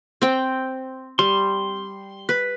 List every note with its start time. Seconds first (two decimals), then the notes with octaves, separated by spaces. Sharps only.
0.22 C4 G5
1.19 G3 C6
2.29 B4